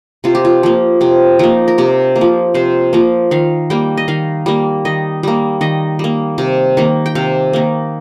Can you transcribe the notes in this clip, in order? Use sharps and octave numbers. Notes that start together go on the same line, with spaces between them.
C3 F4
G4
F4
F3 A#3
C3 C4
F3 A#3 D#4
A#4
C3 G4
A#3
F3
C3 C5
F3 A#3
D#3 F5
G3 A#3 G5
D#5
D#3 F5
G3 A#3
D#3 D#5
G3 A#3
D#3 D#5
G3 A#3
C3
D#3 A#3
G5
C3 F5
D#3 A#3